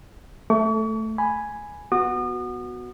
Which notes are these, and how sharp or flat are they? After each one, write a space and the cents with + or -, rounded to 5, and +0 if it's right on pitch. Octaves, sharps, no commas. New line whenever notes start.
A3 +0 C#6 +40
G#5 +0 B5 +0
B3 +0 F#4 -5 D#6 -40